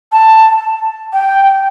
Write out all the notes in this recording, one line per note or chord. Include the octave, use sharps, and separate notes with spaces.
A5
G5